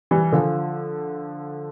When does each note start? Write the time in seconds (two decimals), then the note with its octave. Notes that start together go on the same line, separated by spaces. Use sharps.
0.11 E3 G3
0.32 D3 F3